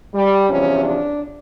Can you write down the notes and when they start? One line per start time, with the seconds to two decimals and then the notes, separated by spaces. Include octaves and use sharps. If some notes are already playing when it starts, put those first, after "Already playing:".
0.14 G3
0.49 E2 C3 F3 C#4
0.85 D4